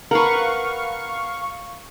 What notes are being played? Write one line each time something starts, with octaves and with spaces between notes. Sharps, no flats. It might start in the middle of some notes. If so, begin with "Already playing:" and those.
A#4 B4 F5 F#5 C#6